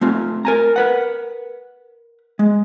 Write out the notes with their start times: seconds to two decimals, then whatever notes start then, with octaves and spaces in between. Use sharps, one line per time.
0.01 A3 C4 F4
0.45 A#4 G#5 A#5
0.76 A#4 B4 F#5
2.39 G#3